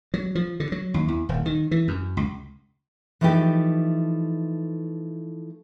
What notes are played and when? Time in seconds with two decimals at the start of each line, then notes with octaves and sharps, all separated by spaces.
0.14 F#3
0.35 F3
0.60 D3
0.72 F#3
0.94 D#2
1.08 E2
1.29 D#1
1.46 D#3
1.71 E3
1.88 F#2
2.17 C#2
3.21 E3 F3 A3 D#4 G4